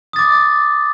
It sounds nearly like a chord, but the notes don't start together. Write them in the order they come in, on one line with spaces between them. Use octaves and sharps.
D#6 A6 D6